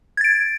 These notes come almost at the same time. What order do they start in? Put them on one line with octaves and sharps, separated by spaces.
G#6 A6 D7